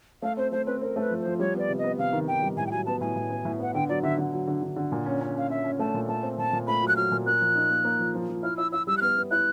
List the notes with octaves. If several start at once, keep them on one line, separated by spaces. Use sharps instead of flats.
A3 F5
C4 C5
A3 C5
C4 B4
C4 A#4
A3 B4
F3
F3 C5
G3 C#5
B3 D5
C3
D#5
B3
C3 F5
D#3
D#3 G5
G3
A2 G#5
G5
F#3 G#5
B3 A5
A2 G#5
A2
B3
A2
B3 F#5
D3 G5
F#3 D5
D3 E5
D3
F#3
D3
D3
D3
A#2
C#4
C#4
C#4 F5
C#4 E5
C#4
A3 A5
A#2
A3 A5
C4
A#2 A5
A#2
A3 B5
F#3
F#6
F#3 F6
A#2
A#3 F#6
F3
D#4
A#3
A#3
F3
F3
F3
E4 F6
E4 E6
E4 E6
G3 E6
F#6
B3 F6
B3
E4 F#6